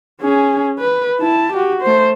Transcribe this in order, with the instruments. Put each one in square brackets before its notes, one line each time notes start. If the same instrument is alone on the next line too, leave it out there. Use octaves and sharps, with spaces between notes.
[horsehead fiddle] C#4 G#4
B4
E4 A5
F#4 G4
A3 C5